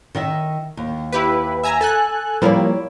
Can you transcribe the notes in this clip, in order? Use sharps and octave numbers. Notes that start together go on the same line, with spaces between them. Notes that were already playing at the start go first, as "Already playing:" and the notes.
D#3 D#5 E5
D#2
E4 G4 B4
E5 G#5 A#5
A4 G#5 F#6
F3 G3 A#3 E4 C#5 D5